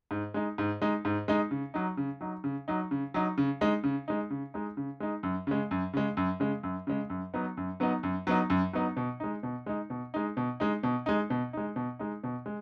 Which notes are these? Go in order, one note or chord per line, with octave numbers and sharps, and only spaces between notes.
G#2
G#3 D#4
G#2
G#3 D#4
G#2
G#3 D#4
C#3
F#3 D#4
C#3
F#3 D#4
C#3
F#3 D#4
C#3
F#3 D#4
C#3
G#3 D#4
C#3
G#3 D#4
C#3
G#3 D#4
C#3
G#3 D#4
F#2
C#3 G#3
F#2
C#3 G#3
F#2
C#3 G#3
F#2
C#3 G#3
F#2
F#3 B3 D#4
F#2
F#3 B3 D#4
F#2
F#3 B3 D#4
F#2
F#3 B3 D#4
B2
G#3 D#4
B2
G#3 D#4
B2
G#3 D#4
B2
G#3 D#4
B2
G#3 D#4
B2
G#3 D#4
B2
G#3 D#4
B2
G#3